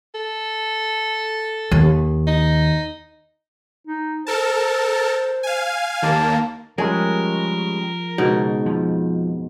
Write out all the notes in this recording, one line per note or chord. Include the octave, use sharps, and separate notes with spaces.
A4
D#2
D#4
D#4
A4 A#4 C5 A5
F5 G#5
D#2 A#3 A5
F3 G3 G#3 C#4 G#4 A#4
C#2 G#2 B2 D#4
F2 F3